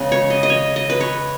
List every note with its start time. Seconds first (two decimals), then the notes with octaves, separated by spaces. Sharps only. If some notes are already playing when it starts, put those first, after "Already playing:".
Already playing: C#3 G#3 B3 D#5
0.12 C#5
0.30 D#5
0.43 D#5
0.50 C#5
0.76 D#5
0.90 B4
1.01 C#5